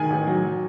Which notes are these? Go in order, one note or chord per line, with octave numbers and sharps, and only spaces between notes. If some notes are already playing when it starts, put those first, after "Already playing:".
Already playing: D#3 G#5
A1
F#3
F#3